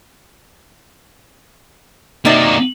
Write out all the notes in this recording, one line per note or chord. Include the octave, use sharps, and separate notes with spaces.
C3 A#3 D#4 F#4 D5